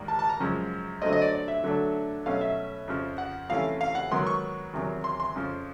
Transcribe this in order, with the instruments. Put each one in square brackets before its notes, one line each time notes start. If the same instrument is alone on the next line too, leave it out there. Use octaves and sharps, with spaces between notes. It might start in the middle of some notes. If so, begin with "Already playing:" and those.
Already playing: [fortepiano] G#2 D#3 G3 A#3
A5
A5
A#5
F#2 C#3 F3 G#3
D3 F#3 A3 C4 D#5
D#5
D5
D5
E5
D3 F#3 A3 D4
B2 F#3 A3 C#4 F5
E5
F2 C#3 F3
F#5
C3 E3 A3 C#4 F5
F5
F#5
G#2 D#3 F#3 B3 C6
C#6
E2 C3 D#3 F#3
C6
C6
F2 C#3 F3